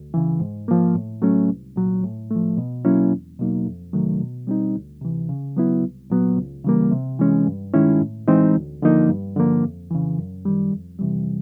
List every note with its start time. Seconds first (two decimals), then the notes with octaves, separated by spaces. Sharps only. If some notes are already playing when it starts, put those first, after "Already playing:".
Already playing: D2
0.14 C#3 E3
0.40 G#2
0.68 F3 A#3
0.95 A2
1.22 F#3 A3 C#4
1.49 C2
1.76 A#2 F#3
2.04 A2
2.30 F3 A3
2.57 B2
2.85 F#3 A#3 C#4 E4
3.11 E2
3.39 B2 F#3 A#3 D#4
3.66 F2
3.93 C3 D#3 F#3 A3
4.21 B2
4.47 G3 C4 D#4
4.75 D2
5.01 C3 E3
5.29 C#3
5.56 F#3 B3 E4
5.84 C2
6.10 A#2 F#3 B3
6.37 C#2
6.64 C#3 E3 G3 A#3
6.92 C3
7.20 E3 G#3 C#4
7.47 G2
7.74 D#3 G#3 C#4 E4
8.01 A2
8.28 E3 G#3 C4 D#4
8.56 D2
8.82 D3 F3 A#3 D#4
9.09 G2
9.36 D3 F3 A#3
9.64 F2
9.90 C#3 E3
10.18 F#2
10.45 D#3 G3
10.72 F2
10.99 C3 E3 G3